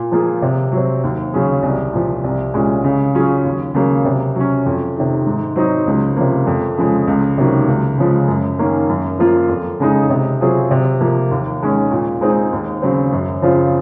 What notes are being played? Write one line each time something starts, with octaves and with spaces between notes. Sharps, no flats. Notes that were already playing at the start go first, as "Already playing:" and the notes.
Already playing: A#2
F3 A#3 F4 G#4
C3
F#3 C4
D#2
C#3 F#3 C#4 G#4
C2
A#2 F3
C2
A#2 G#3 C#4
C#3
F#3 C#4 F4 G#4
D#2
C#3 F#3 A#3
C3
F#3 C#4
F2
C3 D#3
G#2
F#3 C4 D#4
C#2
C3 F3 A#3
F2
C#3 F3 G#3
C#2
C3 D#3 F#3 A#3
C#2
C#3 F3 G#3
F#2
D#3 A#3 C#4
F#2
F3 A#3 F4
F2
C#3 G#3 D#4
C3
F#3 C4 F4 G#4
C3
F3 A#3
D#2
D#3 G#3 C#4
A#2
G#3 C4 D#4 G#4
D#2
C#3 F#3 C4
F#2
C#3 F3 C4 F4